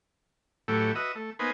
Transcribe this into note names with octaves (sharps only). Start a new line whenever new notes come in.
A2 E3 F#3 A3 G4
F#4 B4 D#5 E5
A3
A#3 B3 D#4 B4 C5 G#5